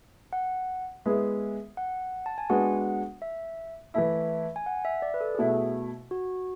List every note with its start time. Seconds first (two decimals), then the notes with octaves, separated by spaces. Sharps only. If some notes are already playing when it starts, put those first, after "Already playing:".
0.33 F#5
1.06 G#3 B3 E4 G#4 E5
1.77 F#5
2.26 A5
2.38 G#5
2.50 G#3 B3 D4 F#4 F#5
3.22 E5
3.94 E3 A3 E4 E5
4.56 G#5
4.66 F#5
4.85 E5
5.02 D5
5.14 B4
5.21 A4
5.34 G#4
5.38 B2 A3 E4 F#4
6.11 F#4